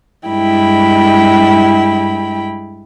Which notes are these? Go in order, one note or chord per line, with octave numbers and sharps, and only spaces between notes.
G2 G#3 E4 G5 B5